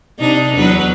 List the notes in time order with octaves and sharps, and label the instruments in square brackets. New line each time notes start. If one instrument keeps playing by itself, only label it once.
[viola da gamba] C3 D4 D#4
E2 F#3 B4